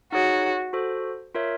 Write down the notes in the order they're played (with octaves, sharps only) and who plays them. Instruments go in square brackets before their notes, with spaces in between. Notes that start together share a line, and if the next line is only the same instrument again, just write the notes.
[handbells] D#4 G#4 C#5 [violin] F#4
[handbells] F#4 A4 C5
F4 A#4 C#5 E5